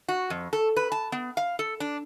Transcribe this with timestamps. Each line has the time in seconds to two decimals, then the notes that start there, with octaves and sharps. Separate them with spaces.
0.08 F#4
0.30 F2
0.53 A4
0.76 B4
0.92 A5
1.12 B3
1.37 F5
1.59 A4
1.80 D4